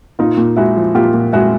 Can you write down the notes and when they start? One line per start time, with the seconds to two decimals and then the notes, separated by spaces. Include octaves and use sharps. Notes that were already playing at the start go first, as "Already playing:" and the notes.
0.19 A#2 D#4 F4
0.37 A#2
0.57 G#3 E4 F#4
0.76 F3
0.95 A#2 F4 G4
1.14 A#2
1.33 G#3 E4 F#4